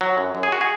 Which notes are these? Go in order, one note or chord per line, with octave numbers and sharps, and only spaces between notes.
F#3
F#2
F#2
G#4
F#4
G#4